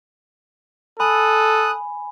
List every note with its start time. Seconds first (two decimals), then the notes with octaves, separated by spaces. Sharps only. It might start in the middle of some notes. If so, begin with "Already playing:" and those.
1.00 A4 G#5 B5 D#6 F#6